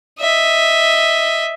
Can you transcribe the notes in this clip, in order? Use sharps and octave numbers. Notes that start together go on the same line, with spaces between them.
D#5 E5